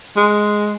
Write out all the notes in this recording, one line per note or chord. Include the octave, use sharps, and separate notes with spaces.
G#3